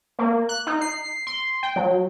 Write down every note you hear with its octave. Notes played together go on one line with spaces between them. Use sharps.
A#3
F#6
D#4
C7
C6
G5
F#3